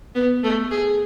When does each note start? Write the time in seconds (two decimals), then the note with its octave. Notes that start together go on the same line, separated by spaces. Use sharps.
0.15 B3
0.44 A3
0.71 G#4